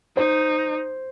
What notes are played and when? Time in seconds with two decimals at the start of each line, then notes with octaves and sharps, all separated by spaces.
0.17 D#4 C5